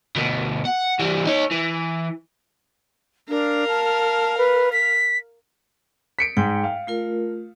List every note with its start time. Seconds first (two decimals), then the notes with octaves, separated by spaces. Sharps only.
0.16 D2 B2
0.65 F#5
0.99 E3 G3
1.27 D#4 C#5
1.51 E3
3.29 D4 A#4 F5
3.68 A5
4.38 B4
4.73 B6
6.19 B6 C#7 D7
6.37 G#2 G5
6.64 F5
6.87 A3 F4 A#4